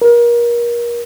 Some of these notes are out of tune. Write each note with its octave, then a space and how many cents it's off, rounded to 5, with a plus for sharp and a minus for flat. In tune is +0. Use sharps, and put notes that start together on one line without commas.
A#4 +30